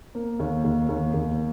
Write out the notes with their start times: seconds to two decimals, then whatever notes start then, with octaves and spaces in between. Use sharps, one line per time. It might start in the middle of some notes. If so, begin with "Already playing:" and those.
0.15 A#3
0.39 D#2
0.64 D#2
0.89 D#2
1.14 D#2